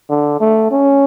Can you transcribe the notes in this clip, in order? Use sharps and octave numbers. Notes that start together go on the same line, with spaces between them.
D3
A3
C#4